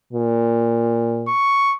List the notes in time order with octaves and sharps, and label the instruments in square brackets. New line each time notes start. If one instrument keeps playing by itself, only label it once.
[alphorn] A#2
[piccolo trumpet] C#6